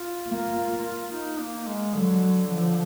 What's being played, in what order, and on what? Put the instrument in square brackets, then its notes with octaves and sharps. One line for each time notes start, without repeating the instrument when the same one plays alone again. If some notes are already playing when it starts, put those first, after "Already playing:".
Already playing: [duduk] F4
[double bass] A#3
[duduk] F4
D#4
A#3
G#3
[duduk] D3 [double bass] F#3
[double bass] F3